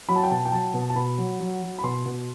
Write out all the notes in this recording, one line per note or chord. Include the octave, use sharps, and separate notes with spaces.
F#3 B5
A5
G5
B2 A5
G5
F#3 A5
B2
A5
B2 B5
F#3
F#3
F#3
B5
B2 C6
B2